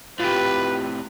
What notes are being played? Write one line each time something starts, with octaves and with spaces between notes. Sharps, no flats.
A2 C3 F4 G4 B4